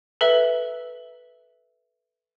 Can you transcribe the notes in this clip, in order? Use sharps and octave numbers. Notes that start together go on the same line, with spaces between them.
A4 B4 E5